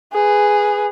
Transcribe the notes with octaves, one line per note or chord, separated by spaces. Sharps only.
G#4 B4